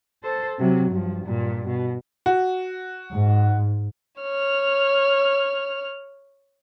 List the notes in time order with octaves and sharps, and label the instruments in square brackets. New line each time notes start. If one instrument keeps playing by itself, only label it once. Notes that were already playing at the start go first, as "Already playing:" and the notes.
[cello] A4 C5
C3 F#3
G2 F3
G2 A#2
B2
[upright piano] F#4
[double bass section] G#2
[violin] C#5 F6